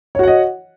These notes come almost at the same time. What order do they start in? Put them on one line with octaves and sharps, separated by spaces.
C#5 F#4 F#5 D#5